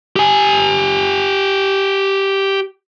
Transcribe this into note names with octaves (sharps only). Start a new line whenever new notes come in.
G4 G#5